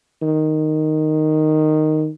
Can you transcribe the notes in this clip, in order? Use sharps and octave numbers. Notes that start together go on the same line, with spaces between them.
D#3